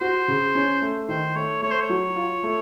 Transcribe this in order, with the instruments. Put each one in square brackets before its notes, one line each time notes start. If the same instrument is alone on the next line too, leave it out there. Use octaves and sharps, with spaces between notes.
[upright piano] F#4 [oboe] C5
[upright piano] C#3
C#4
A3
[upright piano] D#3 [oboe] C5
[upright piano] A3 [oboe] C#5
[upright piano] A3 [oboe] C#5
[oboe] C5
C#5
[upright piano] F#3
F4
A3